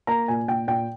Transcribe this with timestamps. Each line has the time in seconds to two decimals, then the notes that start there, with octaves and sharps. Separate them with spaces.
0.07 A#3 A#5
0.28 A#2 G#5
0.48 A#2 G5
0.68 A#2 G5